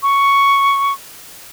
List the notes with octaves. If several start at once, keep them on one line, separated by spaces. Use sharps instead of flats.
C#6